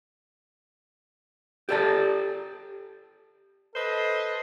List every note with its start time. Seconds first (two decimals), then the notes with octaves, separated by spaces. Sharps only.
1.69 G4 A4 D5 A5
3.75 A4 B4 C5 D#5